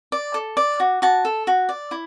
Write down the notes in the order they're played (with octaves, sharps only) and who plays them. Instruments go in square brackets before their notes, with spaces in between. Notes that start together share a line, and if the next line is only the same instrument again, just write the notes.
[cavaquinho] D5
A4
D5
F#4
F#4 A5
A4
F#4
D5
E4